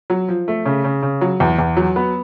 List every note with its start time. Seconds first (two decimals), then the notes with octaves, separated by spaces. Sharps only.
0.10 F#3
0.28 F3
0.48 A3
0.65 C#3
0.84 C#3
1.03 C#3
1.21 F#3
1.40 E2
1.59 E2
1.77 F#3
1.96 B3